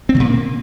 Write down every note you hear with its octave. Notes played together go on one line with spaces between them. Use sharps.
C4
D3
A#2
A#3